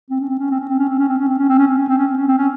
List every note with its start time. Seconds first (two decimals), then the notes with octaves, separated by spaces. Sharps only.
0.10 C4
0.20 C#4
0.29 C4
0.39 C#4
0.50 C4
0.60 C#4
0.69 C4
0.79 C#4
0.89 C4
0.99 C#4
1.08 C4
1.18 C#4
1.28 C4
1.38 C#4
1.49 C4
1.58 C#4
1.67 C4
1.78 C#4
1.88 C4
1.98 C#4
2.07 C4
2.17 C#4
2.27 C4
2.37 C#4